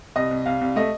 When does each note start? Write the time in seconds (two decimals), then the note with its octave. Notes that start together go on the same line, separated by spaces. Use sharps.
0.16 C2 D#5
0.31 C2
0.46 C2 F5
0.61 C2
0.76 A3 D#5